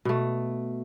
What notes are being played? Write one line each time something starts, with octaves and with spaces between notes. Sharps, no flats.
B2 A3